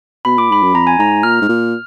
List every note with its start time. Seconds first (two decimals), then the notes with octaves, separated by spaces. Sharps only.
0.25 B2 B5
0.38 A#2 D6
0.50 G#2 B5
0.63 F#2
0.74 F2 A#5
0.87 G#5
0.98 G#2 A#5
1.23 A#2 F6
1.42 G#2
1.49 A#2